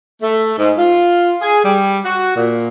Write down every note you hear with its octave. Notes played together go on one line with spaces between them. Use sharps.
A3
G#2
F4
G#4
G3
F#4
A#2